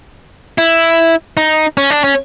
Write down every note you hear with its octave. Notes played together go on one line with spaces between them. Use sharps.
E4
D#4
C#4
D4
C#4